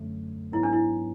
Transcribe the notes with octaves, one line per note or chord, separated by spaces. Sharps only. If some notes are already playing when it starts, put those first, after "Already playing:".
Already playing: F#2 D3 F#3 A3
G#2 F#3 B3 E4
D4
E4